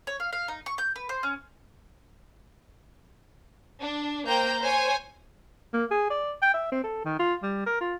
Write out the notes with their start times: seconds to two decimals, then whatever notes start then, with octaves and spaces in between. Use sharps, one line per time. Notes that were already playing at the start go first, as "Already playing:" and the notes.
0.07 C#5
0.20 F5
0.33 F5
0.48 D#4
0.66 C#6
0.78 G6
0.96 B4
1.09 C5
1.23 C#4
3.82 D4
4.27 A#3 C5 G5 A#5 G6
4.61 C5 C#5 G#5
5.74 A#3
5.91 G#4
6.10 D5
6.42 G5
6.54 E5
6.72 C4
6.84 A4
7.05 D#3
7.19 F4
7.43 G3
7.66 A#4
7.81 F4